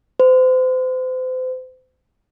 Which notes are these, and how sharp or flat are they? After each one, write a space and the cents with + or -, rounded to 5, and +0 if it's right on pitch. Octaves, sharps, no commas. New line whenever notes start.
C5 -35